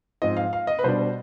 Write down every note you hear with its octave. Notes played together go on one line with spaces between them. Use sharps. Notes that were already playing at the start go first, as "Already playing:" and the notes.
G#2 F3 C4 D#5
F5
F5
D#5
B4
B2 G3 D4 C5